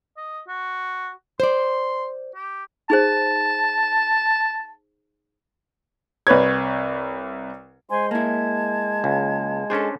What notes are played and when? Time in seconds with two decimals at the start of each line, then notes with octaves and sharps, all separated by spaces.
0.17 D#5
0.48 F#4
1.40 C5 D5 C6
2.35 G4
2.90 D#4 G#4 C5 A5
6.27 C2 B4 C#5 G#6
7.90 G#3 C5 G#5 C6
8.11 A#3 E4 A5 G#6
9.04 C#2
9.70 C#4 D4 G#4 A4 C5